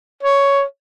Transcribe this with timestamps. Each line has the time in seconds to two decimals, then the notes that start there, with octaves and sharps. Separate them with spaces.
0.23 C#5